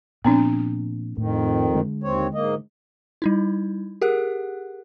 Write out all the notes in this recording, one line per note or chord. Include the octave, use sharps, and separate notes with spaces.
A#2 F3 B3 C4 D4
F2 A2 D#3
D3 G#3
D#2 C4 C#5
G#2 A#3 D#5
G3 D#4 E4
G4 G#4 A#4 F#5 F#6